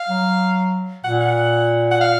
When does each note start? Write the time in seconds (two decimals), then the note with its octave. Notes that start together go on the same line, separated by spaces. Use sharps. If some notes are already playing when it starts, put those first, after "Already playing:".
Already playing: F5
0.09 F#3
1.04 A#2 F#5
1.21 F#5
1.91 F#5
2.01 F5